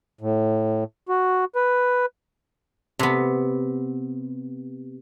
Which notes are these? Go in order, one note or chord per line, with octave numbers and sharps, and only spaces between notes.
A2
F#4
B4
C3 B3